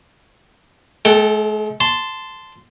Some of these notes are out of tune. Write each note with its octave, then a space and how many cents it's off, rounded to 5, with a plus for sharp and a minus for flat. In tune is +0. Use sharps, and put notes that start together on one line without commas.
G#3 +45 A4 +0 G5 +0
A5 +0 C6 -10